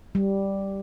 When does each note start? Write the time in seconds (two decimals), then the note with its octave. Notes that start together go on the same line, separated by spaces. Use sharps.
0.15 G3